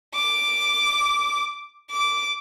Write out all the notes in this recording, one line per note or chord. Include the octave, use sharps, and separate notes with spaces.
D6
D6